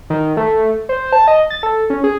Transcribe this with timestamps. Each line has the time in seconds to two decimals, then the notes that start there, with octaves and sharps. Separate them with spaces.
0.10 D#3
0.37 A3
0.89 C5
1.12 A5
1.28 D#5
1.50 A6
1.63 A4
1.90 C#4
2.04 G#4